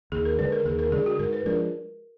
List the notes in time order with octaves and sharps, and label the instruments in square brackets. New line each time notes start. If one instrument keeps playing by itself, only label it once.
[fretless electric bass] D#2 [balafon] G#4
[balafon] A#4
[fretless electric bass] D3 G#3 D4 [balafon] B4
[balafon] A#4
[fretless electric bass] D#2 [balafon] G#4
[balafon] A#4
[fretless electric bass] D3 G#3 D4 [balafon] G#4
[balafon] F#4
[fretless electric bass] G#2 [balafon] A#4
[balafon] B4
[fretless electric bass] F3 G#3 D4 [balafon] A#4